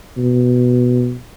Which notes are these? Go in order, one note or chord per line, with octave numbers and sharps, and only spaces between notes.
B2